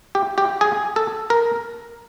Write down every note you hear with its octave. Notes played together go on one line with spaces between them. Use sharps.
G4
G4
G#4
A4
A#4